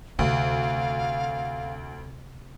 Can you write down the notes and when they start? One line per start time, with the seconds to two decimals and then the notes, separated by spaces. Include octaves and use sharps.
0.19 D2 C3 F5